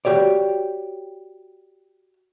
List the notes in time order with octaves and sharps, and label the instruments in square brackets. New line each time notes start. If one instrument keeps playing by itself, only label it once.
[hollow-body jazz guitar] F#4 G4 C#5 D5